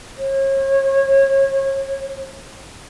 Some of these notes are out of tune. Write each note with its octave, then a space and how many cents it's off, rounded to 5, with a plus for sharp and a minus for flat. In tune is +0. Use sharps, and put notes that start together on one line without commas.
C#5 -35